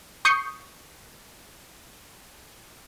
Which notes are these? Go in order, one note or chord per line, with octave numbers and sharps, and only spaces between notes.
C#6 D#6 G6 C7 C#7